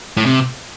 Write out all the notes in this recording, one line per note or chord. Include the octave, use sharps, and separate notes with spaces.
A2
C3